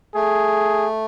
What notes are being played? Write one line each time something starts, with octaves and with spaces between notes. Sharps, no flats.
A3 G#4